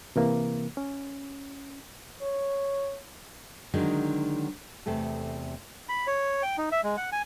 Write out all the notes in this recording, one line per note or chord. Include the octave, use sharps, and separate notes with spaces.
C3 E3 A#3
C#4
C#5
D3 D#3 F#3 G#3 D#4
E2 C3 A3 A4
B5
C#5
G5
D#4
E5
G#3
F#5
G#5